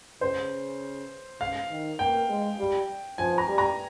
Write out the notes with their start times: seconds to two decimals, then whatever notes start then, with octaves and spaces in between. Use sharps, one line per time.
0.21 C#3 C5
1.40 C#3 F5
1.70 D#3
1.99 A#3 G5
2.29 G#3
2.59 G3
3.18 F3 G#5
3.38 A#5
3.48 G3
3.58 A#5